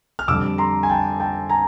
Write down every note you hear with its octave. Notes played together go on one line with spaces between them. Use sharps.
F6
F2 D3 G3 D6 E6
A#5 C6
G#5
G5 A5
G5 A5
G#5 A#5